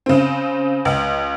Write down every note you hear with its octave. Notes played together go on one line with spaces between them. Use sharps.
C#3 C4
C#2